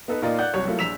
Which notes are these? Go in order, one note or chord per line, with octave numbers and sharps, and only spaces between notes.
B3 D#4 A4 B4
A#2 D#4 F4 A#4 D5 D#5
D5 F#5 F#6 G6
C2 F#3 C#5 C#6
F#3 A3 A#3 E4 F4
A#1 E6 B6 E7 F7